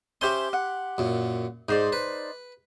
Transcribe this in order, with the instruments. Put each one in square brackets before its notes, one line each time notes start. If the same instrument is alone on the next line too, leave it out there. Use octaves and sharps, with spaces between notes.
[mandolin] C#4 C5 E5 [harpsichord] G4 C6
[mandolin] F#5
[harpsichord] F#2 A#2
[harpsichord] G#2 [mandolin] D#4 C5 D5
[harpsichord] B4